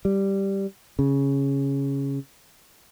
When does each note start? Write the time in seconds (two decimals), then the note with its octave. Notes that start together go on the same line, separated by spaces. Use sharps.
0.05 G3
0.99 C#3